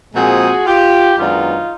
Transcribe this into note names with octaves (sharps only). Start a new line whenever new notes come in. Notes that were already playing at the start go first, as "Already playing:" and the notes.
A#2 F3 G#3 C4 F#4 G#4
F4 G4
F#2 D#3 G#3 B3 D4 D#4 F4